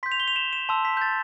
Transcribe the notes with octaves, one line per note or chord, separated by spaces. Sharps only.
C6 G6 B6
F7
G7
F7
E7
E7
A5 C6 E6
B6
G6
A6